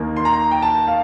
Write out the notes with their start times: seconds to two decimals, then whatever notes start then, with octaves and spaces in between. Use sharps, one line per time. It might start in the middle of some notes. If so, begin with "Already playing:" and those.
Already playing: D#2 D#3 A#3
0.16 C6
0.25 A#5
0.51 G5
0.62 A5
0.87 F5